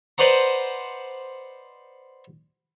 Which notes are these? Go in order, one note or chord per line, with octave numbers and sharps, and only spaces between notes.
B4 C5 D5 D#5 F#5 A#5